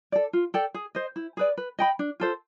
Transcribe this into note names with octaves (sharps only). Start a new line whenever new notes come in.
A4 D5
F4
A4 D5 G5
G#4
C5 D#5
E4
G#4 B4 D5
B4
D#5 G5 B5
D4
F4 A4 C5